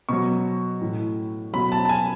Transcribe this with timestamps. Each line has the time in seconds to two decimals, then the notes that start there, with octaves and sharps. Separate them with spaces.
0.09 B2 F#3 C#6
0.81 A2 E3
1.53 B2 F#3 B5
1.72 A5
1.85 A5
1.89 G#5